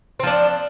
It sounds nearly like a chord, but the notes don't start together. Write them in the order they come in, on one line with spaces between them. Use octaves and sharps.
C4 F3 D4